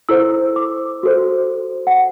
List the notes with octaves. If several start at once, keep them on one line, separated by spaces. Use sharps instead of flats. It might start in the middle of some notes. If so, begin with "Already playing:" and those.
E4 A4 C5 E6
D6
F#4 A4 C5
F#5